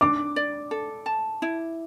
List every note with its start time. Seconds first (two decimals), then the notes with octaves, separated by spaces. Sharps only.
0.01 D4 D6
0.36 D5
0.71 A4
1.06 A5
1.42 E4